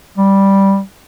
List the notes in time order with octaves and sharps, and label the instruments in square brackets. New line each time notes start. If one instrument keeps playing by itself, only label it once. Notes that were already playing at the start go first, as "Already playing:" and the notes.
[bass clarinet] G3